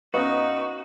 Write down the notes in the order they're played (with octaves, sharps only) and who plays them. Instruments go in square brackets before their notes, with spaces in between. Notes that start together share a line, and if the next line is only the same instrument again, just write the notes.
[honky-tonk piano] F#2 B3 C#4 [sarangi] D#4 [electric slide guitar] F#4 [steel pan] B4 D#5 F5